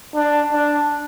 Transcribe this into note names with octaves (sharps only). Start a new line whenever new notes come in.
D4
D4